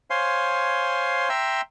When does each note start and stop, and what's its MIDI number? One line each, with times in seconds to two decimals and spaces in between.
0.10 1.29 72
0.10 1.29 73
0.10 1.29 77
0.10 1.29 80
0.10 1.29 84
1.29 1.61 76
1.29 1.61 79
1.29 1.61 82
1.29 1.61 84
1.29 1.61 88